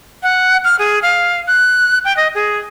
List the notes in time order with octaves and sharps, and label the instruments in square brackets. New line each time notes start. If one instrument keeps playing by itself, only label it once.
[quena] F#5
F6
G#4
F5
F#6
G5
D#5
G#4